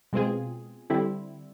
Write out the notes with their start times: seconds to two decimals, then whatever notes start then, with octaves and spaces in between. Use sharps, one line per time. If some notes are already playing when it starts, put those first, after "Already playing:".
0.13 B2 G#3 C4 F4 G#4
0.90 D3 G3 C4 E4